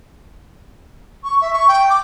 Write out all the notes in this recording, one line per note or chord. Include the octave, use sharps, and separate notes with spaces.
C#6
E5
C#6
G5
D6